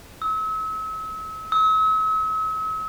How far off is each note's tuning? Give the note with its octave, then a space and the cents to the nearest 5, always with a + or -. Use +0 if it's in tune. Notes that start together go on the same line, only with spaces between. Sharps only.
E6 -40
E6 -45